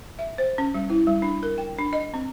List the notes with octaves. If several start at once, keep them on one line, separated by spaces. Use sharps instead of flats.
E5
C5
C#4
G3
E4
G3
D4
A#4
G5
D4
D#5
C4